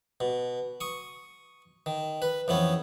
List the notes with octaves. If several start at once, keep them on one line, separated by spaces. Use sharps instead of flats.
B2
C#6 D#6
D#3
B4
F2 E3 B3 C#4